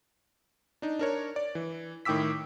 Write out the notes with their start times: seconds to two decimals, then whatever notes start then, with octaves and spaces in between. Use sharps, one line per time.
0.82 D4 D#4
0.99 D4 A#4 C#5
1.36 D5
1.55 E3
2.05 A2 D#3 G5 D6 E6 B6